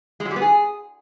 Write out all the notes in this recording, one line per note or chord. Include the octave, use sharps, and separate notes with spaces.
G#3
F#3
G3
B3
G#4